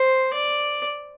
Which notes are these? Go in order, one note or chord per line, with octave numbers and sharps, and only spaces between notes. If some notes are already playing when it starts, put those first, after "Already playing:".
Already playing: C5
D5